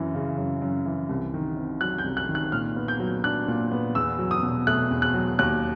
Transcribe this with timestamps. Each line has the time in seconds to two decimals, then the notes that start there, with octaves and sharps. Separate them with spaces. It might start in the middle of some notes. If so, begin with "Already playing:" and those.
Already playing: F#2 E3
0.15 C#3
0.37 F#2
0.62 F#2
0.85 E3
1.09 C2
1.34 D#3
1.57 C3
1.81 F#3 F#6
1.98 G6
2.04 C2
2.17 F#6
2.29 D#3
2.35 F#6
2.52 A#2 F6
2.76 B3
2.88 G6
3.00 F#3
3.24 D4 F#6
3.48 A#2
3.71 B3
3.95 E2 E6
4.19 F#3
4.31 D#6
4.43 B2
4.67 A3 F#6
4.91 E2
5.02 F#6
5.14 F#3
5.39 D#2 F#6